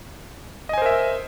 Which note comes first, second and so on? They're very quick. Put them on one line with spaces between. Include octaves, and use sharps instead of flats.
D#5 G#5 C5 A#4 E5